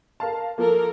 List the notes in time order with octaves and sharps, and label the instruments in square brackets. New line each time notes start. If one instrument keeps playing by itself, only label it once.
[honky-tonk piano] A#4 F5 A5
[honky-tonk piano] F3 A#3 [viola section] A4 A#4